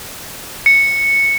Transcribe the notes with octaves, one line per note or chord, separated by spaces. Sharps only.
C#7